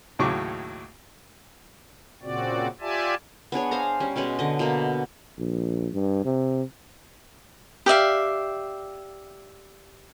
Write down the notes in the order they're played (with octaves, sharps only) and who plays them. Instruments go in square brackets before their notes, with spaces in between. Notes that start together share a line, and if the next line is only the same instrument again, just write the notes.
[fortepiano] D#2 A2 C#3 F#3 C#6 D6
[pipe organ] A#2 C#3 C4 F#4 D5
F4 G4 D5 E5 G#5 A5
[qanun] B3 D4 G#4 C#5
C5 F5 G#5 A#5
G3 C#4
B2 G#3 C#4 B4
D3 D#5
B2 A#3
[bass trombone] A#1
G2
C3
[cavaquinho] G4 D5 E5 F5